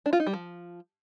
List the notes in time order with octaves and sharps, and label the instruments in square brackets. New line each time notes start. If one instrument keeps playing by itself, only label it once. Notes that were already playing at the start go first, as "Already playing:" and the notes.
[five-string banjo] D4
F4
D#4
G3
F3